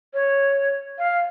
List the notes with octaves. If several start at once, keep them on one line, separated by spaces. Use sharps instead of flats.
C#5
F5